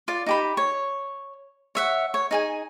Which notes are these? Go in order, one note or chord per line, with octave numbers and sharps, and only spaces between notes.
F4 D5 D6
D#4 G4 B5
C#5
C#5 E5 F#5
C#5
D#4 G#4 G#5